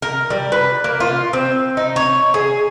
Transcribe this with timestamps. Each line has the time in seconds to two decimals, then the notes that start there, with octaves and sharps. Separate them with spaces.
0.02 A#4
0.30 G3
0.52 B4
0.84 A#3
1.00 F4
1.33 C4
1.77 D#4
1.96 C#5
2.34 G#4